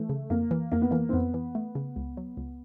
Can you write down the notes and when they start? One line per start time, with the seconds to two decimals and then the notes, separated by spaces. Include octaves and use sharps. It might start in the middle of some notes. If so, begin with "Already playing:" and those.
Already playing: E3 A3
0.09 C#3
0.30 F2 A#3
0.51 E3
0.72 F2 A#3
0.82 B3
0.91 E3 A#3
1.09 C4
1.13 F2 B3
1.34 E3
1.55 A3
1.75 C#3
1.96 C#2
2.17 F#3
2.37 C#2